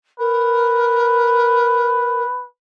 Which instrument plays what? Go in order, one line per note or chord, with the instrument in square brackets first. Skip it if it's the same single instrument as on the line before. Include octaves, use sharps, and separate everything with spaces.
[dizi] A#4 [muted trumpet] B4